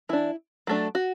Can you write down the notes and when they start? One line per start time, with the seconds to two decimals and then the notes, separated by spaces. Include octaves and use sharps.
0.09 E3 D4 E4
0.67 F#3 A3 D4
0.95 F#4